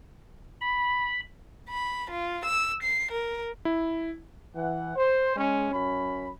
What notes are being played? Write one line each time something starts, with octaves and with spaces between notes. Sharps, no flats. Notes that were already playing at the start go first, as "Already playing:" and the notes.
B5
B5
F4
E6
C7
A#4
E4
E3 F#5
C5
G#3 C#4
F#2 C#4 B5